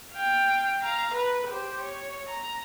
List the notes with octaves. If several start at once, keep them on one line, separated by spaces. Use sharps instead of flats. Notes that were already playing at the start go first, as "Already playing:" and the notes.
F5 G5
F5 A#5
B4
G4 C5
C#5
A#5